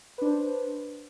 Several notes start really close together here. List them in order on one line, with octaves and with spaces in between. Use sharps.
B4 D4 C5